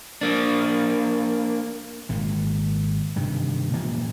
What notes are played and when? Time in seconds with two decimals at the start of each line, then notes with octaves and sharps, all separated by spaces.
0.21 A#3 D4
2.09 G#1 A#2
3.16 G2 C3 D#3
3.73 A#2 E3 F3 G3